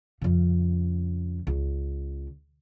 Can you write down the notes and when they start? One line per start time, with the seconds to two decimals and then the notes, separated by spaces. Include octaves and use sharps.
0.21 F2 C#3
1.47 C#2